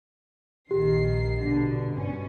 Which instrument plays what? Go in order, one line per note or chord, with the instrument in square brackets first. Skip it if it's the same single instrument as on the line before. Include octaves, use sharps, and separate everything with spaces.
[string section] A#1 D#3 C7 [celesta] G4
[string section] B2 D3
G1 B2 C#4